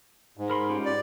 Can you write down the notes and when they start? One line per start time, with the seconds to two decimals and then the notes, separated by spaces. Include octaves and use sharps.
0.37 G#2
0.50 A#4 B5 C6
0.69 C#4 F4 G4
0.85 D5